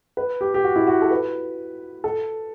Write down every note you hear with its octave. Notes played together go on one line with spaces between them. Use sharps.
B4
G4
G4
F#4
E4
F#4
A4
B4
A4